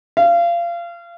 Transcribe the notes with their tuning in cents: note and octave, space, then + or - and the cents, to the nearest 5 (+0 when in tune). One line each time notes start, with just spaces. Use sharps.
F5 -25